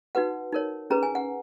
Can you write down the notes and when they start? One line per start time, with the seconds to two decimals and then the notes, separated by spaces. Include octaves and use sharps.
0.15 D#4 F#4 B4 F#5
0.52 D#4 A#4 C#5
0.90 C#4 G#4 B4 A#5
1.03 G#5
1.15 F#5